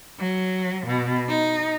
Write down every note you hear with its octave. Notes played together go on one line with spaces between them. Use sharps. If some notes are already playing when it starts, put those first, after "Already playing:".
F#3
B2
D#4